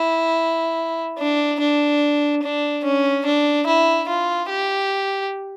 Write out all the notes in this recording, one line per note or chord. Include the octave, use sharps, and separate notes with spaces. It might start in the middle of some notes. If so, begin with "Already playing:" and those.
Already playing: E4
D4
D4
D4
C#4
D4
E4
F4
G4